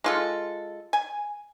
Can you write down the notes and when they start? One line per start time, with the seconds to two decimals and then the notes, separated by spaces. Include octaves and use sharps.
0.04 G#3 F4 A4
0.93 G#5